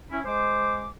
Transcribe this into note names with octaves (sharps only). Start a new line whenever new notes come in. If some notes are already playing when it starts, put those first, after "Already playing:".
C#4 E4
G#3 C5 D6